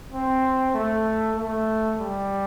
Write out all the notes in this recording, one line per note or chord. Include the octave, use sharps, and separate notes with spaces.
C4
A3
A3
G3